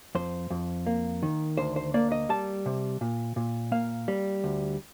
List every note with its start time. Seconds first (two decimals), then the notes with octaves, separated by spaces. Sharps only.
0.15 F2 C5
0.50 F2
0.87 A#3
1.23 D#3
1.57 D2 C5
1.76 C5
1.94 A#3 D5
2.12 D#5
2.29 G3 A5
2.66 C3
3.01 A#2
3.36 A#2
3.72 A#3 F5
4.08 G3
4.44 D2